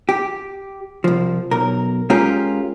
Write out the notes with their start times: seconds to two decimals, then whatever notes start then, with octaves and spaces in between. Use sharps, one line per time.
0.09 G4
1.04 C2 F3
1.51 B1 A#4
2.10 G#3 C#4 F4 G4 A#4